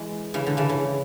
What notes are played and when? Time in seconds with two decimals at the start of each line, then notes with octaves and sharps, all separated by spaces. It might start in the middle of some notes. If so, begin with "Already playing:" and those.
Already playing: E3 G#3
0.34 C#3 E3
0.47 D3
0.57 C#3 E3
0.69 C#3